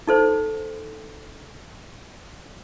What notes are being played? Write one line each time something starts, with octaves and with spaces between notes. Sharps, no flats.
D#4 A4 C5